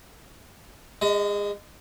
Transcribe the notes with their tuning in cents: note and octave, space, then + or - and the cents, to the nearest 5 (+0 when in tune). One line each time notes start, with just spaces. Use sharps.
G#3 -30 D#5 +30